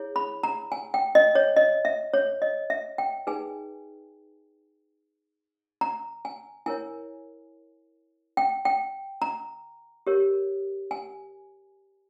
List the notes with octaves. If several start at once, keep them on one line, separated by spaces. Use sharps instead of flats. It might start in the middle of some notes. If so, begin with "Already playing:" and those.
Already playing: E4 G#4 C#5
B5
A#5
G#5
G5
D#5
C#5
D#5
E5
C#5
D#5
E5
G5
D#4 G#4 B4 G#5
A#5
G#5
E4 A#4 C#5 G#5
G5
G5
A#5
G4 A#4 C#5
G#5